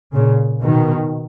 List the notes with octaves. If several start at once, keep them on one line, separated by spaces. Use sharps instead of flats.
A#2 C#3
B2 D#3